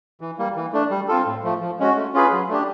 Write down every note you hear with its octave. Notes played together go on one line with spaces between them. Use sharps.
E3
G3 A#3
E3
A3 D4
G3
C4 F4 A4
A2
F3 A3
F3
G#3 C#4 F#4
A3
C#4 F4 G#4 B4
F#3
A3 D4 G4